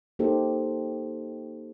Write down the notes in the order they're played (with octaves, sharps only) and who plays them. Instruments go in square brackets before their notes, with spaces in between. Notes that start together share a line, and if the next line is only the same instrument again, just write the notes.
[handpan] A#3 D#4 G4 A4 C5